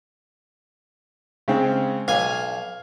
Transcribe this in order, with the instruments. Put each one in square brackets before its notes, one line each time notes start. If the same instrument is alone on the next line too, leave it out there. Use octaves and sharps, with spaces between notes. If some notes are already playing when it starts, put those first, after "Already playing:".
[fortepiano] C#3 G#3 C4
[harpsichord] B1 G#5 [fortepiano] F5